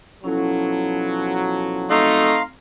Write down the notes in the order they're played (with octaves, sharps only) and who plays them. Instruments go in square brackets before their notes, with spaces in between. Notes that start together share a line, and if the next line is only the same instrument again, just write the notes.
[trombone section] B2 F3 F#3 [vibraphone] C#4 E4 A4
[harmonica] A3 D#4 [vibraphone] C4 [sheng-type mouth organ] F5 A#5 C6